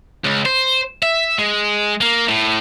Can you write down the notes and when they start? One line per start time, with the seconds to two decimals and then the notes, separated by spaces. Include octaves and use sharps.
0.24 C#2
0.46 C5
1.03 E5
1.38 G#3
2.01 A#3
2.28 A2